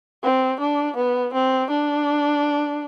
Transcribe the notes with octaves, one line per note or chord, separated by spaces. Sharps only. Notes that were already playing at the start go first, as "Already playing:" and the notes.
C4
D4
B3
C4
D4